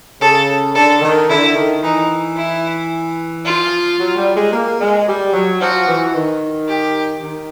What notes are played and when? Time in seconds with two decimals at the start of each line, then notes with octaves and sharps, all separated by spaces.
0.21 C#3 A4
0.75 D3 A4
1.01 D#3
1.28 D3 E4
1.55 D#3
1.83 E3 D#4
2.37 E4
3.45 F3 F4
3.99 F#3
4.16 G3
4.35 G#3
4.53 A#3
4.80 G#3
5.07 G3
5.33 F#3
5.60 F3 F#4
5.87 E3
6.14 D#3
6.68 G4
7.23 D#3